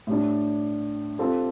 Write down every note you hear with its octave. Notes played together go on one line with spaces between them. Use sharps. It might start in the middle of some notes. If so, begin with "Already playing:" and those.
A2 G3 D4
G3 C4 F4 A4